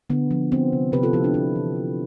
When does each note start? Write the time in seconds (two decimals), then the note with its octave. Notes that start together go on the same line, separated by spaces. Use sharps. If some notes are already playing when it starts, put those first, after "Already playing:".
0.10 D3 B3
0.31 F3
0.52 B3 C4
0.73 C3
0.92 C3 G4 B4
1.03 F4 A4
1.13 F3 E4 G4
1.24 D4 F4
1.34 B3 C4 E4
1.56 E3
1.76 E3